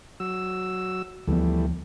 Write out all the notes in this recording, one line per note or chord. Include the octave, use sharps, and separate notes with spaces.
F#3 E6
D2 E3 F3 G3 A3 B3